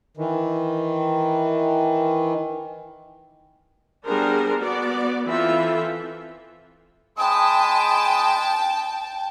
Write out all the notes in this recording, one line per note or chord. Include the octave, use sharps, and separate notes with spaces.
D#3 E3
G3 B3 D4 G#4 A#4 C5
B3 F#4 D5
E3 C4 E4 F4 A4 E5
G#3 G5 A5 B5 D#6